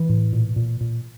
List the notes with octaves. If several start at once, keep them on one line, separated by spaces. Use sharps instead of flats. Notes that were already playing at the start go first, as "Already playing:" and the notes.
Already playing: E3
A2
A#2
A#2
A#2